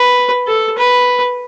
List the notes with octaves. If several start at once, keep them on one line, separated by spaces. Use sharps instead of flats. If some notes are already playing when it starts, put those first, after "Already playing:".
Already playing: B4
A4
B4